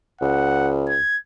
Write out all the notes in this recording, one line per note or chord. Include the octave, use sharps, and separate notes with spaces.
C#2 F#5
G#6